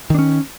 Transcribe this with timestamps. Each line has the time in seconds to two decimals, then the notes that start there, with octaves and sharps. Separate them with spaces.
0.10 D#3
0.14 D4
0.19 C#4